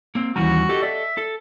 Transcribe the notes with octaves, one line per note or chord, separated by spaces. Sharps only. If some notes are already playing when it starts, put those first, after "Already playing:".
A#3 C4
D#2 E3 G3 C#4 F#4 A#5
G4 A4 D#5
D5 E5
A4